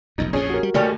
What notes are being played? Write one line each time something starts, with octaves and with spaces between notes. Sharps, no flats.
F1 B1 F2 D#4
A#1 F2 A2 C#4 G#4 C#5
F#4 G4 A#4
G3
D#2 D#3 G3 A3 C#4